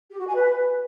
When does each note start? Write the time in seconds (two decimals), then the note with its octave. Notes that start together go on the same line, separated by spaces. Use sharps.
0.11 G4
0.19 F#4
0.26 G#5
0.34 B4